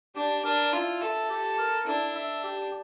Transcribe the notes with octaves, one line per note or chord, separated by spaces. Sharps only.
D4 G4
D4 A#4
E4 F4
A4 E5
G4
A#4
D4 E4
E5
G4